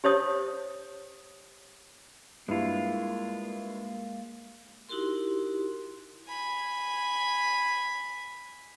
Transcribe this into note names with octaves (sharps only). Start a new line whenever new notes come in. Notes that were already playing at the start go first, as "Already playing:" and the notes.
G4 C5 C#5 D#6
G2 G#3 A#3 E4 F4
D#4 E4 F#4 G4 A#4 C6
G#5 B5